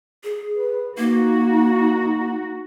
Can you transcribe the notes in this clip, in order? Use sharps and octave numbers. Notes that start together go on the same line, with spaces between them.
G#4
B4
A#3 D#4 F#4